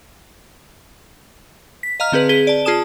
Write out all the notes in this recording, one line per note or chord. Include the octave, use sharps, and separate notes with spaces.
B6
D#5 F5 A#5 F6
D3 C4 G#4 B4
G#4 B6 G7
D5 A5
F4 G#4 A5 D#6 E7